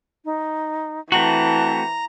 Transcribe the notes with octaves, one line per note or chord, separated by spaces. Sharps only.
D#4
E3 A3 C4 F#4 A5 A#5